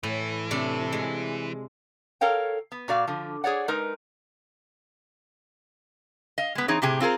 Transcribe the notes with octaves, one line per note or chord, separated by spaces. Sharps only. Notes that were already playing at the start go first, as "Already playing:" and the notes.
A2 E3
C3 A3 D4
G#3
A4 A#4 C#5 F5 G5
B3
A#2 F#4 D5 F5
D3 F3
G#4 C#5 D5 F#5
G#3 D#4 A#4 B4
D#5 F5
G#3 B3
E3 C4 D#4 G#4 C#5
A2 C3 G4 G#4
C4 F4 G#4 A#4